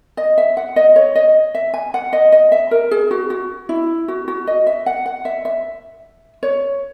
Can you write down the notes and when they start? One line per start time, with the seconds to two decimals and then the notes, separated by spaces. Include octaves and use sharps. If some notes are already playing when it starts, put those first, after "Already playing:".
0.17 D#5
0.38 E5
0.57 F#5
0.76 D#5
0.96 C#5
1.15 D#5
1.55 E5
1.74 G#5
1.94 F#5
2.13 D#5
2.32 D#5
2.52 E5
2.71 A#4
2.91 G#4
3.11 F#4
3.30 F#4
3.69 E4
4.08 F#4
4.28 F#4
4.47 D#5
4.67 E5
4.86 F#5
5.06 F#5
5.25 E5
5.45 E5
6.43 C#5